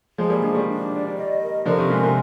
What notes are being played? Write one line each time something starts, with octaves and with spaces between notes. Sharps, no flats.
F3 G#3 G#4
G3 A#3
F3 G#3 D4
D#3 G3
D4
D5
D#5
A#4
D3 F3 A#4
C3 D#3
G#2 C3 G#5
C3